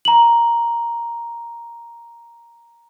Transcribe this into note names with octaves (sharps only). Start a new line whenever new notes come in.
A#5 F#7